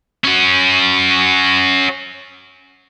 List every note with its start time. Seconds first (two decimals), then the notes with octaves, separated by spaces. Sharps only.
0.24 C#4 F#4